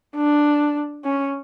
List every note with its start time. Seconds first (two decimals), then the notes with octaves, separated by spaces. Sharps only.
0.16 D4
1.05 C#4